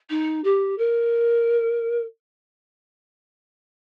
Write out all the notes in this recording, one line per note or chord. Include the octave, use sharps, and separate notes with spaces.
D#4
G4
A#4